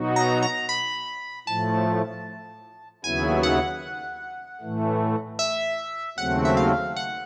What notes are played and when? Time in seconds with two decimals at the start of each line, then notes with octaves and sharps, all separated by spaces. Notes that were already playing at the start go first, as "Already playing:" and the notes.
Already playing: B2 F#3 B3 D#4 F#4
0.16 A#5
0.43 A#5
0.69 B5
1.47 A2 F3 A3 A5
3.04 D#2 C#3 F#3 B3 E4 G#5
3.43 F#5
4.61 A2 E3 A3
5.39 E5
6.18 D#2 C#3 F#3 A3 C4 F#5
6.45 E5
6.57 F5
6.96 F#5